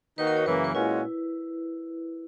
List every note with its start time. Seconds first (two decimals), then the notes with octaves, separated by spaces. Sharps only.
0.18 D#3 A#3 D#4 F#4 B4
0.27 A#4
0.37 C#5
0.46 F#2 C#3 E3 A#3 B4
0.64 B4
0.74 A#2 G#3 C#4 E4 F#4